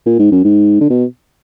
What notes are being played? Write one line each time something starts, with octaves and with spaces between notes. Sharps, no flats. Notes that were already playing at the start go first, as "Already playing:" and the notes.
A#2
G#2
F#2
G#2
D3
B2